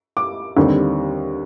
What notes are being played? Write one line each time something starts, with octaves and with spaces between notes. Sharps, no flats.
D6
D#2 D3 G3 C4